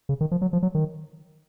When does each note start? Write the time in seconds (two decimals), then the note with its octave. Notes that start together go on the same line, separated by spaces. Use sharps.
0.09 C#3
0.21 D#3
0.31 F3
0.42 F#3
0.53 F3
0.63 F#3
0.75 D#3